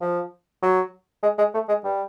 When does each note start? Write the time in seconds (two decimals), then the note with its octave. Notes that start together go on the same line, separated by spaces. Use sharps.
0.01 F3
0.62 F#3
1.23 G#3
1.38 G#3
1.54 A3
1.68 G#3
1.84 G3